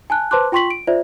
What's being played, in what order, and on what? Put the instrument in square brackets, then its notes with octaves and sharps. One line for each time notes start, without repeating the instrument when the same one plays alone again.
[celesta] G#5 A5 F#6
B4 C5 A5 C6 D6 F#6
F4 G5 C6 C#6 B6 F#7
D7
F4 C5 D5 E5